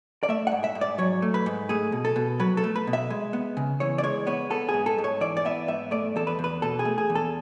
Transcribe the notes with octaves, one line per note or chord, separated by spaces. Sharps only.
D5
A3 E5
G#2 F#5
E5
G#2
D5
F#3 C#5
A3
B4
G#2
A3 G#4
B2
A4
B2
F#3 B4
A4
A3
B4
B2
E5
G#3
B3
C#3
E3 C#5
D5
G#3 C#5
B3 C#5
B3 A4
G#4
G#2
A4
G#2
C#5
E3 D5
D5
B3 E5
G#2 E5
A3 D5
E2 A4
B4
E2
B4
B2 A4
G#4
A3
G#4
E2
A4